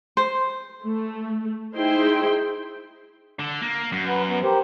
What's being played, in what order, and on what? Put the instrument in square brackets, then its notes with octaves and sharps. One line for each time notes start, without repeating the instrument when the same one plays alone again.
[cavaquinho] C5
[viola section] A3
D#4 E4 G#4 C5 G5 C6
[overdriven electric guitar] D3
A#3
F#2
[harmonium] B4 F#5
B3
G4 A#4 C5